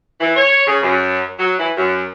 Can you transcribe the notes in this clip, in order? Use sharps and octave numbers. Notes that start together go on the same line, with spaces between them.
E3
C#5
C#3
F#2
F#3
E3
F#2